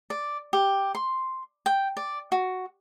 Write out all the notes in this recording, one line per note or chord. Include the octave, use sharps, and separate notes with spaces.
D5
G4
C6
G5
D5
F#4